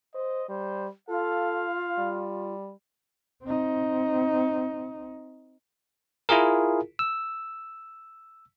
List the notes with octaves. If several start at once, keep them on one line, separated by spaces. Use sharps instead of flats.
C5 D#5
G3 C5
F4 A4 F5
G3
C4 D#4
E4 F4 G#4 A#4
E6